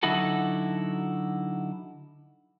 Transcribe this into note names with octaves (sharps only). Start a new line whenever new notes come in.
D3 F#3 D#4 E4 F#4 A4